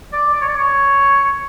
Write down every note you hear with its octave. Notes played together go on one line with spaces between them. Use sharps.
D5
D5
C#5
D5
C#5